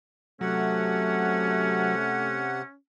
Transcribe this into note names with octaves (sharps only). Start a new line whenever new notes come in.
C3 F#3 A3 C#4 F#5